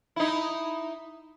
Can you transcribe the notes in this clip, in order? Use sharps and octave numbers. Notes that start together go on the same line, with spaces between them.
D#4 E4